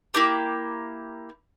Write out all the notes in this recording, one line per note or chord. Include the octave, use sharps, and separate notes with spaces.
A#3 E4 G4 D6